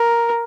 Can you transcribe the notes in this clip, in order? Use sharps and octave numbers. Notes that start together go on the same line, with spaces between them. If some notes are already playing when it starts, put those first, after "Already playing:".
Already playing: A#4